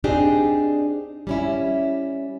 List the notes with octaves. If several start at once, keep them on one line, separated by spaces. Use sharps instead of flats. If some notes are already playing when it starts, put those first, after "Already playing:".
C4 D4 D#4 G4 G#4
G3 C#4 E4